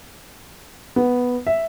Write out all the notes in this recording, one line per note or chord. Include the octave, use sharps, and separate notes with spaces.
B3
E5